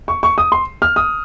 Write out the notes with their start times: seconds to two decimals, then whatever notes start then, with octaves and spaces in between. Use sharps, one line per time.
0.08 C#6
0.23 C#6
0.38 D#6
0.52 C6
0.82 F6
0.96 D#6